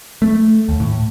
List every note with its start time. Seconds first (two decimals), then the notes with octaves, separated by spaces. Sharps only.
0.22 A3
0.69 D#2
0.80 A2